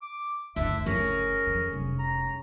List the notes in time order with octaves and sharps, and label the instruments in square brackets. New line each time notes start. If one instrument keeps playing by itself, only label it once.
[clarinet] D6
[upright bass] F#1 D2 [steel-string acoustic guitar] D3 [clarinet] E5
[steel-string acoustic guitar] C#4 G#4 [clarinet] A#4
[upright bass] F2
F1 G3
[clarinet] A#5